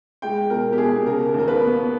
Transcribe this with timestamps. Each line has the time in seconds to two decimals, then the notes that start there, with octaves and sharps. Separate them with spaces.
0.22 G#3 G5
0.50 B2 A#4
0.73 G4
0.78 B2 G#4
1.06 C#3 A#4
1.34 D#2
1.39 A#4
1.48 B4
1.61 B3